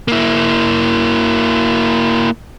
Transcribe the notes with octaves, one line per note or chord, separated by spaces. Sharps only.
A#3 E4